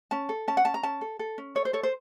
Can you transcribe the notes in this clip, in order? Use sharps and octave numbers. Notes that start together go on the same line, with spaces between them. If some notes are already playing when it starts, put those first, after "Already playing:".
C#4 A5
A4
C#4 A5
F#5
C#4 A5
A#5
C#4 A5
A4
A4
C#4
A4 C#5
C5
A4 C#5
C5